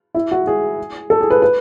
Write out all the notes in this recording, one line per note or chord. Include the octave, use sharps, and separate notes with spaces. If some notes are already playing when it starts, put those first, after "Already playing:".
E4
F#4
G#4
A4
G#4
B4
B4